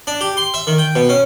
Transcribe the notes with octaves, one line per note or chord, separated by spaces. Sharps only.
D4
G4
C6
E5
D#3
G5
B2
C#4